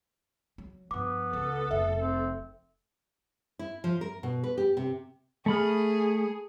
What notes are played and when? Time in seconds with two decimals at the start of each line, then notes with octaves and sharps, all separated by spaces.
0.58 F#3
0.91 G2 F3 B3 D6
1.33 C#2 A4
1.71 F1 F2 E5
2.01 C4
3.59 E4
3.84 F3
4.01 A#4
4.23 B2
4.44 B4
4.58 G4
4.77 C3
5.46 A3 G#4 B5 F6